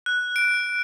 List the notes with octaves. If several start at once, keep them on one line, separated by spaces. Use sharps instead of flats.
F#6
D7